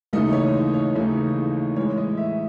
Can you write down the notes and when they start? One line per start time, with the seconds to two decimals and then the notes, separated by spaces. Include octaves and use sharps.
0.13 D#2 C#3 E3 A3 D#4 D#5
0.33 C#5
0.74 C#5
0.95 D#2 C#3 E3 A3 D#4
1.76 A2 E3 G#3 C#5
1.97 D#5
2.17 E5